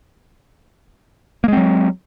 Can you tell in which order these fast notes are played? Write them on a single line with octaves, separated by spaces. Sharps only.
A#3 G#3 C4 F#3